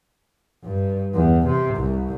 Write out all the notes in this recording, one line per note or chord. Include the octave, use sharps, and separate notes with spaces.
G2
E2
C3
C2